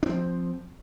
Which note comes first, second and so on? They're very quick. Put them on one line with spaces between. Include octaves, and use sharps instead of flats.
D4 C4 F3